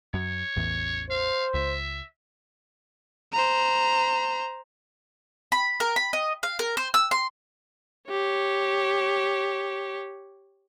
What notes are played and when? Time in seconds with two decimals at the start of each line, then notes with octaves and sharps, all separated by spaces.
0.14 F#2 C#5
0.56 A1 E2
1.10 C5 F5
1.54 C#2 E5
3.32 C5 A#5
5.52 B5
5.80 A#4
5.96 B5
6.13 D#5
6.43 F5
6.59 A#4
6.77 C5
6.94 E6
7.11 C6
8.09 G4 C#5